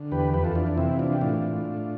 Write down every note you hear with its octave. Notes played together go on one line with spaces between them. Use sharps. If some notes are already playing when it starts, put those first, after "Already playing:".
Already playing: D3
E2 G4 B4
F2 G4 B4
F4 A4
E3 D4 F4
D4
C3 C4 E4
E3 D4 F4
G4
A2 D4 F4
A2
A2